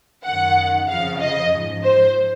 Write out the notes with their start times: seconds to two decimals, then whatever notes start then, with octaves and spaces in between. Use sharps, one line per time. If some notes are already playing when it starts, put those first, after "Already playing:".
0.25 F#2 D#3 F#5
0.89 F2 C#3 F3 F5
1.20 D#5
1.52 G#2 F3
1.83 C5